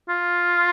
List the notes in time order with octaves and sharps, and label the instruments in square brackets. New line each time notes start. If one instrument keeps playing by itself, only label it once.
[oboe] F4